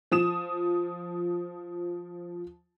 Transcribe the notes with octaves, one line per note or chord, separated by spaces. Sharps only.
F3 D#6 E7